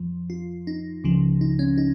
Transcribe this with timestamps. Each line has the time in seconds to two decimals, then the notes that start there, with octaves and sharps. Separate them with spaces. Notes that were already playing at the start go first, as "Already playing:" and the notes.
Already playing: F2 F3
0.30 F4
0.67 D#4
1.04 C#2 C#3 F3
1.41 D#4
1.59 C#4
1.78 D#4